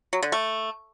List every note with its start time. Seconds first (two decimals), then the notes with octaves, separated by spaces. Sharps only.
0.13 F#3
0.23 D3
0.32 A3